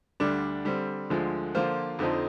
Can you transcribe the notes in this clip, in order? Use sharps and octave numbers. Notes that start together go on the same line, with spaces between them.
D2 D3 G3 D4
D3 G3 C4
D2 D3 F3 G#3
D3 F3 A#3 F4 C5
F2 D3 F3 C4 D#4